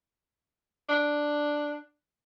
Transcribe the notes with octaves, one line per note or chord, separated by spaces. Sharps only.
D4